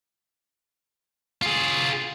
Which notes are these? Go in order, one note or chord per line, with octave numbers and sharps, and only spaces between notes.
F4 G#4